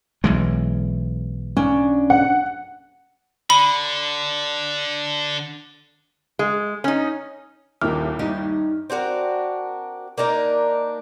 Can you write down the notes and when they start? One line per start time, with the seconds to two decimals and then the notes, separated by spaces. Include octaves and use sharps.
0.24 B1 E3 G#3
1.57 A#3 C#4 D4
2.10 F#5
3.50 D3 B5
6.39 G#3
6.84 C#4 D#4
7.81 D#1 D#2 D#3 E4 D6 F6
8.19 G2 C#4 D#4 G4
8.90 C4 D4 F#4 A#4
10.18 A#3 D4 D#4 A#4